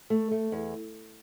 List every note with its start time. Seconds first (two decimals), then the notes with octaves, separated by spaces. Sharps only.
0.10 A3
0.31 A3
0.52 E2